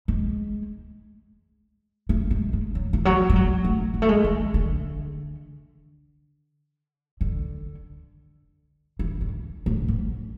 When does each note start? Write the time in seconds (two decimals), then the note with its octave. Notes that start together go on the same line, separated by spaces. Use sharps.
0.08 G#3
2.09 A3
2.31 G#3
2.53 G#3
2.75 F#3
2.93 E3
3.05 F#3
3.30 G#3
3.36 F#3
3.65 A3
3.94 G#3
4.02 A3
4.09 G#3
4.24 E3
4.54 D3
7.21 D3
8.99 E3
9.21 D3
9.66 A2
9.88 G#2